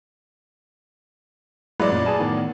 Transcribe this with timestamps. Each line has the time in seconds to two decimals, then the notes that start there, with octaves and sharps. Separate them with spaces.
1.80 A1 F#3 G#3 E4 B4 D5
1.91 F#2 A#2
2.06 G#4 G#5 A5
2.20 A2 D#3 B3